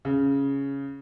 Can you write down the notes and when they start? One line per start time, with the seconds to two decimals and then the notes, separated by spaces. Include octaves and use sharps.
0.05 C#3